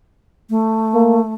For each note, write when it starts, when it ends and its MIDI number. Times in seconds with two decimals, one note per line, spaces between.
0.50 1.34 57
0.94 1.19 58